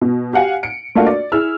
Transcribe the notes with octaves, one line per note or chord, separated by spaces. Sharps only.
B2
G4 F5 F#5 G#5
C#7 D7
A3 A#3 D4 F4 F#4
D5
E4 G#4 E6 F6